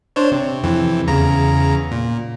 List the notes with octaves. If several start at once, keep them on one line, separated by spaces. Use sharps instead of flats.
D4 C5 C#5
C3
F2 C3 E3
E2 C#3 A#5
A#2